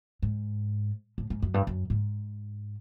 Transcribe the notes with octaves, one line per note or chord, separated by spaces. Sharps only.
G#2
A2
G#2
F#2
G2
F#2
G#2